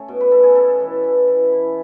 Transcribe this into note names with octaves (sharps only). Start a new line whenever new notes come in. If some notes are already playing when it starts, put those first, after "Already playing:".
Already playing: A3 C#4 A4 C#5
B2
B4
B2 A4
G#4
C#4 A4
E3
E3
E3
E4